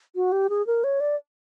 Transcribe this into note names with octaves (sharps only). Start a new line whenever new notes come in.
F#4
G4
G#4
A#4
C#5
D5